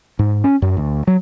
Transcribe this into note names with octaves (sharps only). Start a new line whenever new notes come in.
G#2
C#4
F#2
D2
F#3